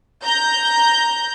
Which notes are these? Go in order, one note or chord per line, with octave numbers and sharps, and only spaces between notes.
A#5 G6